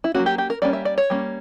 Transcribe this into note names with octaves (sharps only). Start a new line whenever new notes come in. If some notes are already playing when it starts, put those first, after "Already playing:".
E4
F#3 A#3 C#4 F#4
G4
G4
A#4
G3 A#3 C#4 D5
E5
D5
C#5
G3 A#3 C#4